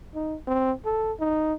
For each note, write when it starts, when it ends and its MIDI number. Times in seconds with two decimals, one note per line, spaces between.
0.15 0.35 63
0.47 0.72 60
0.85 1.13 69
1.20 1.54 63